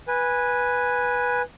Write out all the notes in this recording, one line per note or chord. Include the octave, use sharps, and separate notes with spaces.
B4 G#5